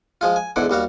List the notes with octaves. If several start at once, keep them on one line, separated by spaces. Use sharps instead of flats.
F3 G#3 F4
G#5
E2 G#2 D3 F#5 D6
D#2 G3 F#4 F5